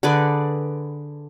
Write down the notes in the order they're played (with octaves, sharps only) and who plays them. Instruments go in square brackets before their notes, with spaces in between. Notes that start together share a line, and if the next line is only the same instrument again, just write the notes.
[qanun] D3 G#4 B4 D5